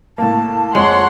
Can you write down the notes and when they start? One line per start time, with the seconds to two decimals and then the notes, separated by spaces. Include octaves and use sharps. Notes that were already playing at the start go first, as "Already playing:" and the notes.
0.18 A2 A#3 A5
0.75 F2 G#3 C#5 F#5 C6 F#7